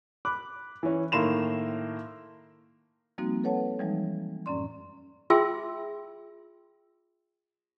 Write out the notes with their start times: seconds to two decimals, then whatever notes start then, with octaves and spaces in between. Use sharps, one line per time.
0.25 B5 D6 F#6
0.83 E3 C#4
1.12 A2 D#3 A#3 C6 E7 F7
3.18 F3 G3 A#3 C4 D#4 F#4
3.44 A4 B4 C#5 F#5 A5
3.79 E3 F3 G3 G#3 D#4
4.46 F#2 A2 C#4 D5 C6
5.30 F4 G#4 E5 G5 C6 E6